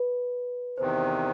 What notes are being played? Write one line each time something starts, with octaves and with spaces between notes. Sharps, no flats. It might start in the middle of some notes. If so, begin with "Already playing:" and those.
Already playing: B4
E2 C3 D#3 C5